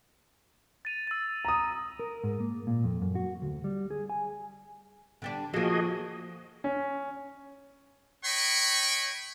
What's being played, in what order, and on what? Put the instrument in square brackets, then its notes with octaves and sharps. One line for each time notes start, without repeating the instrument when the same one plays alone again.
[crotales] A6 D#7 F7
E6 A6
[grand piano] A#5 D#6
[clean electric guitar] A#4
G#2
A#3
A#2
F2
F#2
F#4
D2
G3
G#4
G#5
[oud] D3 G3 D4
[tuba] F3 [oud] A#3 A4 [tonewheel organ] F#4 G#4 D#5
[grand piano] C#4
[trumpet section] C#5 D#5 G5 B5 C#6